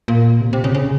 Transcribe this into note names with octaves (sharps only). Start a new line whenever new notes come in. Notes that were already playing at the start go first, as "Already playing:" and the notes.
A#2
C3
C3
C#3
C#3